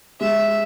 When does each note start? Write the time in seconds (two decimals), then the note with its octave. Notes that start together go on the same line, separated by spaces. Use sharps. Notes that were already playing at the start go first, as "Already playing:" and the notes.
0.20 G#3 E5